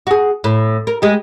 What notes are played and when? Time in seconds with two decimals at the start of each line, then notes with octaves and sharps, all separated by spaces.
0.07 F#4 G#4
0.44 A2
0.87 A#4
1.02 G3 G#3